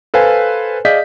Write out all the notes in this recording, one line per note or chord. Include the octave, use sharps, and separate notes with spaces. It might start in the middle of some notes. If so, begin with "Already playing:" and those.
A4 B4 C5 F5 G#5
G#4 D5 D#5 F5 G6 B6